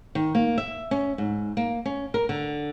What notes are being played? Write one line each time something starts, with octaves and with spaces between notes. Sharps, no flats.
D#3
A#3
E5
C#4
G#2
A#3
C#4
A#4
D3